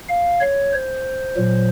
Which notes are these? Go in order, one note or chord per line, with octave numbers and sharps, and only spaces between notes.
F5
C#5
C5
A#2 F#3